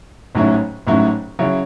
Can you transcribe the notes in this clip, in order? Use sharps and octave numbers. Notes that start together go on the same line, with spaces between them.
A1 G#2 F#3 C#4 E4
A1 G#2 F#3 C#4 E4
C#3 F#3 C#4 E4